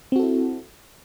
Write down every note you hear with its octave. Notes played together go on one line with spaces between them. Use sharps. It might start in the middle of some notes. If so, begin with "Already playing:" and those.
C4 E4 F#4 A4